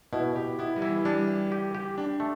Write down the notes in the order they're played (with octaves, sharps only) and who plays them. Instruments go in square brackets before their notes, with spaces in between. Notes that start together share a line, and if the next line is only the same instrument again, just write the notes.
[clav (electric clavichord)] B2 [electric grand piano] E4
[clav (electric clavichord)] B2 [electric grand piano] G4
[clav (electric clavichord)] B3 [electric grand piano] E4
[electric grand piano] G3
[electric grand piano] E3 [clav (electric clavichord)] E4
[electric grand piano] G3 [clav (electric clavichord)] D4
[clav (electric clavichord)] G4
G4
G4
[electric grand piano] D4 [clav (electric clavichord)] G4
[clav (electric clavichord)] A3